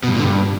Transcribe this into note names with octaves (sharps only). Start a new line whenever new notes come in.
B2
G2
A#2
D3
G2